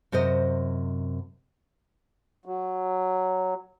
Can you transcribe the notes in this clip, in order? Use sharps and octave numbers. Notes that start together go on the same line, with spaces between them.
F#2 C3 C5 D#5
F#3